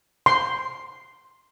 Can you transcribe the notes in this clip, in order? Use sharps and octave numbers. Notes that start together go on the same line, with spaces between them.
C6